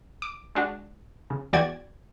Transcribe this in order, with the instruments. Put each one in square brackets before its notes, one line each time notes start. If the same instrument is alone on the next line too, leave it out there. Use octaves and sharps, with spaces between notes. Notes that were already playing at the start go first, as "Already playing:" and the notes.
[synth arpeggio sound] D6
G#3 D4 F#4
C#3
E2 F#4 D5 G5 G#6